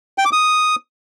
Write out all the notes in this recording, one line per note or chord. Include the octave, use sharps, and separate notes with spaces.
G5
D6
D#6